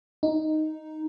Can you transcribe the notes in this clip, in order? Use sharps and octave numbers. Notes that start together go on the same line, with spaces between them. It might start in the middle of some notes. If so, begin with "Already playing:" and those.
D#4